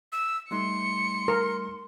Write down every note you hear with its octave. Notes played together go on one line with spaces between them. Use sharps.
E6
G3 A3 D#4 C6 C#7
A#4